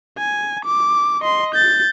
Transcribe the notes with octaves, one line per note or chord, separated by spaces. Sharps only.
G#5
D6
D#5 C6
G6 A6